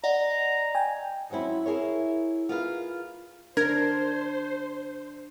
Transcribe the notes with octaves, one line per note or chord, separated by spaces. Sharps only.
D5 D#5 F#5 A#5
G5 G#5
D#3 F#3 C4 C#4 E4
E4 G#4 A#4 C#5
F4 G#4 A#4 B4 F5
D4 A#4 C5 G#6